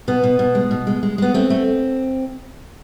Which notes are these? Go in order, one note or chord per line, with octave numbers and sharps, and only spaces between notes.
B2 B3
B2
B2
G#3
B2
G#3
G#3
G#3 B3
A3 C4
A3